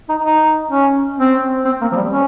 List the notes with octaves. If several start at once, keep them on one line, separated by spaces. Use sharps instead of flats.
D#4
D#4
C#4
C4
C4
A#3
F3
G3
C#4